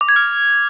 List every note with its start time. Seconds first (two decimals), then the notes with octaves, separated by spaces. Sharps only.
0.01 D6
0.09 G#6
0.16 F6